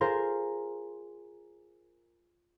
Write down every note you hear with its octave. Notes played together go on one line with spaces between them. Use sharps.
F4 G#4 A#4 C5